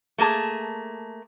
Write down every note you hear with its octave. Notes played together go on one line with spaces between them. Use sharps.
A3 A#3 G#4 A5